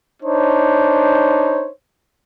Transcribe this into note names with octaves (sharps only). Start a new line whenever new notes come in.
D4 D#4 C5 C#5